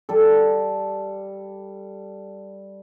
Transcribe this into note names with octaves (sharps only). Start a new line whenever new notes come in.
G3 A4